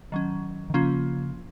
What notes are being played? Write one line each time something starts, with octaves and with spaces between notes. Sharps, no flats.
D#3 F#3 C#4
D#3
C#3 F3 A#3 C#4 F4